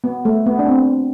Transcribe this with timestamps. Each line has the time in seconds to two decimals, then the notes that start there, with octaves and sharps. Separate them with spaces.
0.04 B3
0.25 A3
0.46 B3
0.59 D4
0.68 C4